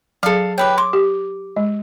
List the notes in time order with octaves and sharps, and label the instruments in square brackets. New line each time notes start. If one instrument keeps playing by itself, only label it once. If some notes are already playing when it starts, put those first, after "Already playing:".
[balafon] F#3 G#4 [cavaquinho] A4 F5
[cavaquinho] G4 B4 G5 [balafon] C#5
[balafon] C6 [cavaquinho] D6
[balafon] G4
G#3